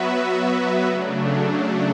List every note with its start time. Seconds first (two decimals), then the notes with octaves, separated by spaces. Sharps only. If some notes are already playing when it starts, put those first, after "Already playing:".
Already playing: F#3 B3 F#4 B4 E5
0.87 C#3 F#3 A3 D4